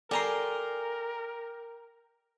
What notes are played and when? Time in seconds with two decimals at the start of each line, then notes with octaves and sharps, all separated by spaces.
0.11 G4 A4 A#4 D5 G#5 A#5 C6